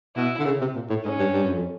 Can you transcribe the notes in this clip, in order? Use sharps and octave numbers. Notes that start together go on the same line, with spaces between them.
B2 E4
D3
C#3
C3
A#2
A2
G#2 C#4
G2
G2
F#2
F2